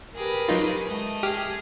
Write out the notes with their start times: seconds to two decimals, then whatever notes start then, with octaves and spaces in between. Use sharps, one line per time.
0.15 G4 G#4 A#4 B4
0.48 F#3 D#4 F4
0.89 G#3 A3 D#5
1.23 G4 G#4 F6